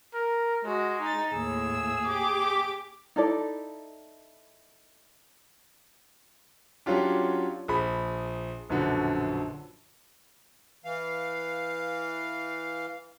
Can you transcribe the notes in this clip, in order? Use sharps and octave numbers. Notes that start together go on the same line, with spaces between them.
A#4
G#3 F#4
D#4 A6
D#2 A2 G#4 E6
G4 D6
D#4 E4 A4 D5
F#3 C#4 D4 F4 G4
A#1 G#4 B5
A#1 F#2 B2 D3
E3 F5